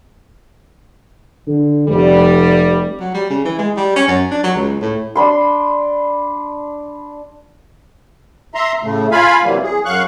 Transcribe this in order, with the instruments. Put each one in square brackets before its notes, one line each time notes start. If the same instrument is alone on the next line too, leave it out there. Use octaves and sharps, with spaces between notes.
[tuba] D3
[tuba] F1 [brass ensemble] G3
[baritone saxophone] F#3
G3
C#3
E3
G#3
G3
C#4
F#2
D4
F#3
C#2
A2
[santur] D4 B5 C6
[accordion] E5 A#5 C6
A2 C#3 A3
F4 F5 G#5 B5
C3 E3 F#3 G3 A#3
G#4
F#2 F#3 F5 C#6 F#6